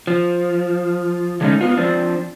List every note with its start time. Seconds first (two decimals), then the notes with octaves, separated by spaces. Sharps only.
0.07 F3
1.41 D3 F#3 G#3 A3 C#4 D#4
1.61 B3 F4
1.77 F3 C4 D4